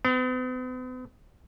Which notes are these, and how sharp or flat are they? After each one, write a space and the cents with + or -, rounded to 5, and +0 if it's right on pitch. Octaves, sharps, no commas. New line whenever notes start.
B3 +45